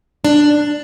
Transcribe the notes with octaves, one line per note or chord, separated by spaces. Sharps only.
D4